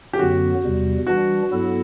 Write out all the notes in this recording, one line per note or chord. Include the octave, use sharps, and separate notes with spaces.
G4
F#2 D3 F#3 B3 F#4
E2 C3 G3
E3 G3 D4 F#4
G2 F#3 B3 E4 A4